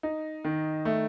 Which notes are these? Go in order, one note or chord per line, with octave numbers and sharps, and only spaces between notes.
D#4
D#3
A3